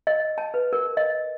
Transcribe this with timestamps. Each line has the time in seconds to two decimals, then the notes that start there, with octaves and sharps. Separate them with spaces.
0.07 D#5
0.38 A5
0.54 B4
0.73 A#4
0.97 D#5